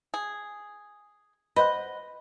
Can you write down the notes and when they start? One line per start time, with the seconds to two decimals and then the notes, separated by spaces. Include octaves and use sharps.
0.14 G#4
1.56 B4 C5 D#5 F#5